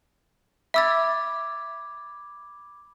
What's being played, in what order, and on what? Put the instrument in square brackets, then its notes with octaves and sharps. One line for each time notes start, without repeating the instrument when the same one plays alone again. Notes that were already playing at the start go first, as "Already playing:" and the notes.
[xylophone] E5 E6 A6 [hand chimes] B5 D6 G#6